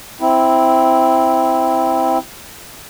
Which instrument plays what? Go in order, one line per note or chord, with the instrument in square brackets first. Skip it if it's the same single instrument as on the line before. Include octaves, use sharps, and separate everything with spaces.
[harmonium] C4 E4